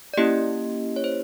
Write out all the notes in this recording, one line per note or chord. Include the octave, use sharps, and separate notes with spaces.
D5
A#3 C#4 E4 G4 D#5
C#5
C5